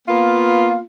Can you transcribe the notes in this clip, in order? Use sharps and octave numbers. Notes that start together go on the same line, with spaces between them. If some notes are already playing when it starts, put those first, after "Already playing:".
A#3 B3 F4